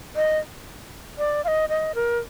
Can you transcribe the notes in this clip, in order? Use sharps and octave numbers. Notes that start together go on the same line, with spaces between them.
D#5
D5
F5
D#5
D#5
A#4